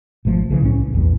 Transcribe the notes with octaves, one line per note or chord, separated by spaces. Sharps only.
G#1 B2 F3 A3
B1 C#3 E3
C2 A2 F3 C#4
A#1 E2 G2